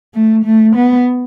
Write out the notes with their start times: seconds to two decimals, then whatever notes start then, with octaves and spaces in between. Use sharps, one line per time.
0.14 A3
0.45 A3
0.75 B3